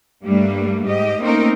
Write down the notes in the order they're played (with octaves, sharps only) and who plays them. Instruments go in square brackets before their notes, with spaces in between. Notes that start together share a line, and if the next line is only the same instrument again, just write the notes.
[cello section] G2 G3 A3 A#3 D4
G#2 G4 D#5
A3 A#3 C4 C#4 D#4 A#4